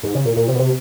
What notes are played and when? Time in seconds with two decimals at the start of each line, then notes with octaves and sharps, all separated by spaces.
0.03 G#2
0.15 C#3
0.25 A#2
0.36 A#2
0.48 C3
0.55 B2
0.59 C3